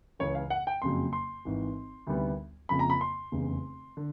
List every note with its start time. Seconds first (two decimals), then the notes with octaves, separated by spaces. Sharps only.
0.19 C#2 C#3 E3 C#5
0.35 F5
0.50 F#5
0.67 G5
0.82 F#1 F2 C#3 F#3 C6
1.13 C6
1.45 G#1 G#2 E3
2.07 D2 C3 D#3 G3 B3
2.69 F2 C#3 F3 A#3 B5
2.79 A#5
2.90 B5
3.01 C6
3.32 F1 E2 C#3
3.97 D3